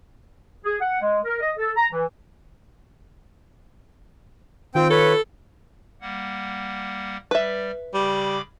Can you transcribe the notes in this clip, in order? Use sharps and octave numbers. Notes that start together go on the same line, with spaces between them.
G#4
F#5
G#3
A#4
D#5
A4
A#5
E3
D#3 C4 F4 G5
A4 B4 C#5
G3 A#3 F#5
G3 B4 D5 E5
C#3 G3 B5 D6